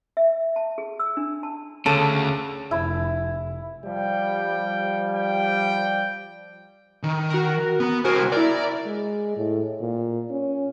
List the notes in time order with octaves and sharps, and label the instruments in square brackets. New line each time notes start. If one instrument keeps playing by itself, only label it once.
[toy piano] E5
A5
G#4
E6
D4
A5
[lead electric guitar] D2 [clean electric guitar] C#3 [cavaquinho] A4
[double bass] F1 [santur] E4
[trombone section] F3 G3 [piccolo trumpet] G5
[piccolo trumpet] G5
[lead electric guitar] D#3
[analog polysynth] F#4 A#4
[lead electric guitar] B3
[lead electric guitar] C2 A#4 [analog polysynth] F#4 C5 G#5
[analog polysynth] E4 A#4 [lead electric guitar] D5
[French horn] G#3
A2
A#2
C#4